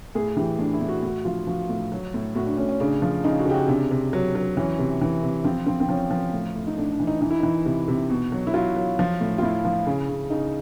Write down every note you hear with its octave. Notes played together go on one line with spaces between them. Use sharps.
A2 G#4
E3 G4
A2 D4
E4
A2
F#4
A2 F#4
F3 F4
F3 F#4
A2
F#3
A2
A2 F#4
D4
A2 C#4
C#4
C#3 D4
F3
C#3 D#4
F#4
C#3 G4
F#4
C3 D4
C3
F#3
F#3
E3 C#4
C3
E3
C3
F3 C4
F3 C4
C4
F3 C#4
F3
A2
A2
D#4
A2 D4
D4
E3
D#4
E3 D#4
E4
E3 D#4
C3
C3
B2
F#3
E4
F#3 F4
F#3
F3
A2
F4
A2 E4
F3
C#3
C#3
C#3 D#4